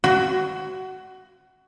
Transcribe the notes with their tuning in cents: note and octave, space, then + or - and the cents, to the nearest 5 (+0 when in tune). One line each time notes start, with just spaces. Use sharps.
F#4 +20